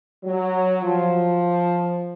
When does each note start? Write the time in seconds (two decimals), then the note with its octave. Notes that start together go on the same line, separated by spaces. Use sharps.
0.24 F#3
0.83 F3